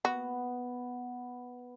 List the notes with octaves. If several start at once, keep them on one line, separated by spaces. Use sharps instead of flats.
B3 F#4